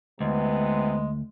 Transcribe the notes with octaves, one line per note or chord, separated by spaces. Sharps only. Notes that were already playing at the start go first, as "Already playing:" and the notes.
D2 C3 E3 G#3 B3